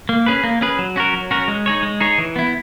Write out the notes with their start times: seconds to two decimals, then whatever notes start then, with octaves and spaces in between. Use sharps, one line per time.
0.09 A#3
0.26 C#4 G#4 B4
0.44 A#3
0.61 C#4 G#4 B4
0.79 F#3
0.96 C#4 F#4 A#4
1.14 F#3
1.31 C#4 F#4 A#4
1.48 G#3
1.66 D#4 G#4 C#5
1.83 G#3
2.00 D#4 G#4 C#5
2.18 E3
2.36 B3 E4